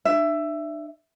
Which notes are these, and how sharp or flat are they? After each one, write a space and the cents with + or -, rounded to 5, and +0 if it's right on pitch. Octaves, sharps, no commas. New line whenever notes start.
D4 +40 E5 +15